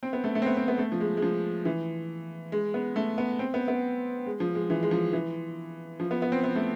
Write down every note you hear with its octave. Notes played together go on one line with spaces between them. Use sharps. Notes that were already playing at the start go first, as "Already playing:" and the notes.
C4
B3
A3
A3
C4
B3
C4
B3
A3
F3
G#3
G#3
F3
E3
G#3
B3
A3
B3
C4
B3
B3
G#3
F3
G#3
E3
G#3
F3
E3
F3
B3
B3
C4
B3
A3